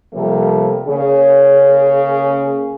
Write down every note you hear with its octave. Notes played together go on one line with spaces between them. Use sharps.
C3 F3 G3 A3 A#3
C#3 A#3 C#4 G#4